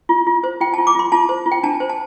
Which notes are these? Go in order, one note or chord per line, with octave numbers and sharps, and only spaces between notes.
F4
F4
C5
F4 G5
A5
F4
D6
F4 C6
F4 A5
C5
F4
G5
D4 A5
C5
A5